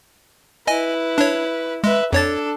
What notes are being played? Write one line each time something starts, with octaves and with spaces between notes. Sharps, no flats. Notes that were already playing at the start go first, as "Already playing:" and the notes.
E4 B4 D#5 G#5
D4 C#5
G#3 B4 E5
F2 D4 A4 C#5 A6